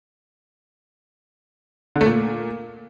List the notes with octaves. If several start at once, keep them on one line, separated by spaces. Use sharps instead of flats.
D3
A3
A#2